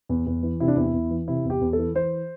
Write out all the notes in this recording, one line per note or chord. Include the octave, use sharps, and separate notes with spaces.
E2
E2
E3
C3 E4
D4
E2 E4
E2
E3
C3 E4
E2 G4
E2
E3 A4
E3 C5